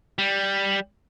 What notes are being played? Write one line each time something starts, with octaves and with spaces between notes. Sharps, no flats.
G3